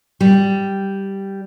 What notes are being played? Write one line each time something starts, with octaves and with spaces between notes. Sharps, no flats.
G3